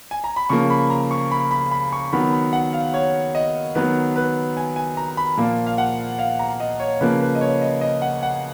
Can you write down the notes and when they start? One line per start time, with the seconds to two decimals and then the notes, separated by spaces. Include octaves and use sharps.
0.11 G#5
0.24 A#5
0.36 B5
0.49 C#3 F3 A#3 C#6
0.70 B5
0.90 A#5
1.11 C#6
1.31 B5
1.51 B5
1.71 B5
1.92 C#6
2.12 D#3 F#3 B3 B5
2.33 B5
2.53 F#5
2.73 F5
2.94 C#5
3.35 D#5
3.75 D#3 F#3 B3 B4
4.16 B4
4.57 G#5
4.76 G#5
4.97 A#5
5.17 B5
5.38 A#2 F3 A#3
5.66 F5
5.78 F#5
6.19 F5
6.39 A#5
6.60 D#5
6.80 C#5
7.01 C#3 F3 A#3 B4
7.21 B4
7.35 D#5
7.41 C#5
7.62 D#5
7.81 D#5
8.02 F#5
8.23 F#5